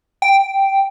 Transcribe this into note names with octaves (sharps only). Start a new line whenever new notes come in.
G5